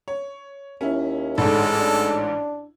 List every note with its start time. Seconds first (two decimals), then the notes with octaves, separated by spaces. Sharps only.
0.08 C#5
0.81 D#2 C#4 E4
1.38 A1 G#2 D3 G#3 A4
1.80 D4